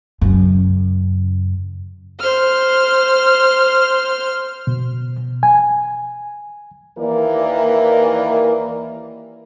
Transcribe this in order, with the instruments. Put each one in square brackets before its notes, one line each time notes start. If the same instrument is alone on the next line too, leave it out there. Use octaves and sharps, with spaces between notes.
[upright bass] F#2 C#3
[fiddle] C5 F6
[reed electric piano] B2
G#5
[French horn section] D#2 E3 A#3 A#4 D5